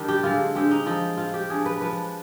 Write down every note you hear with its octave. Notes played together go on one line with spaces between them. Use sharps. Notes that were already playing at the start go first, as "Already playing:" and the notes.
Already playing: D#3 G3 D4
G4
D3 G#3 C4 F4
D3 G#3 C4 G4
D#4
F3 C4 D#4
F3 C4 F4
G4
F3 G#3 D4 G#4
B4
F3 G#3 D4 B4